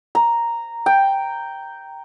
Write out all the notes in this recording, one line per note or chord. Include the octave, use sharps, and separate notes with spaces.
A#5
G5